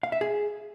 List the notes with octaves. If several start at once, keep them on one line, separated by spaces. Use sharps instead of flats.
F5
E5
G#4